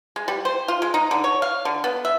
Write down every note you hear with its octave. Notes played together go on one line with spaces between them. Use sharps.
G#3
G3
C5
F4
G#3
D#4
D3
C#5
F5
D3
B3
E5